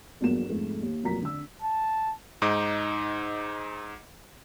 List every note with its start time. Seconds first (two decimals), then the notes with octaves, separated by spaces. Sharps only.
0.21 G1 E2 F#3 A#3 E7
0.49 F2 G#2 A3
0.82 D#2
1.03 F1 A#2 F#3 A#3 A#5 B6
1.22 D3 E6
1.62 A5
2.42 G#2 D#4 D#5 D6